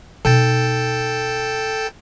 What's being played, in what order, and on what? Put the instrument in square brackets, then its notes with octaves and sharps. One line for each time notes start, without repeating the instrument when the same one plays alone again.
[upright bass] B2 D#4 [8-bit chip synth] A4 G5 A5